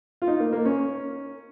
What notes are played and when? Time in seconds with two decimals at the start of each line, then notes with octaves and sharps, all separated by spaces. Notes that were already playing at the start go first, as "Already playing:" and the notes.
0.22 F4
0.27 D#4
0.40 A#3
0.53 A#3
0.65 C#4